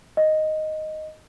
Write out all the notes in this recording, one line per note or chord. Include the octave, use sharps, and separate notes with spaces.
D#5